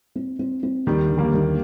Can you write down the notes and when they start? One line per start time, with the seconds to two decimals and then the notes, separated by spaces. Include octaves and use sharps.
0.15 C4
0.39 C4
0.63 C4
0.86 D#2 D#3 G3
1.10 D3
1.17 G3 A#3
1.34 D#2